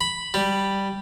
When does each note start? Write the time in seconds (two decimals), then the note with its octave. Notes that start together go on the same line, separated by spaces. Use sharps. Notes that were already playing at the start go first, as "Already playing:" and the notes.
0.01 B5
0.34 G3